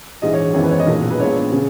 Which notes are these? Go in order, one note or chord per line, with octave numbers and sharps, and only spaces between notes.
A#1 G#2 E3 D#5
C#5
G#1 F#2 E3 B3 C#5
B4
C#5
D#5
B1 A#2 G#3
B4
A#1 A#2 G#3 B3 C#5
C#3